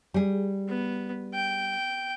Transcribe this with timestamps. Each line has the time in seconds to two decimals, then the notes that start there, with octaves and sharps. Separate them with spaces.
0.14 G3 G#4
0.67 B3
1.34 G5